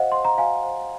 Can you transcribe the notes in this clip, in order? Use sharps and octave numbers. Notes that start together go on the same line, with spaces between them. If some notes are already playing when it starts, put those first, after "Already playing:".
Already playing: F#4 C5 D#5 F5 F#5
C5 C6
A#5
F#4 F5 G#5
C5